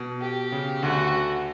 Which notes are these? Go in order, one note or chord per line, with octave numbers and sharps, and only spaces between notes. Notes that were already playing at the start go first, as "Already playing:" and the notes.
Already playing: B2
G4
C#3
D2 D3 F#4